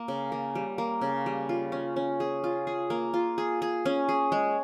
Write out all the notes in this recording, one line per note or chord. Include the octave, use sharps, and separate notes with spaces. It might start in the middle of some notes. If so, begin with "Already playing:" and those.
Already playing: A#3
C#3
A#3
G3
A#3
C#3
G3
F4
C#4
C#4
G#4
F4
G#4
A#3
F4
G#4
G#4
C#4
G#4
G#3